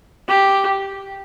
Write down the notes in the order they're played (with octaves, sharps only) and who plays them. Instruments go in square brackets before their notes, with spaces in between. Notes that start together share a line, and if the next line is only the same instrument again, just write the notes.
[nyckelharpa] G4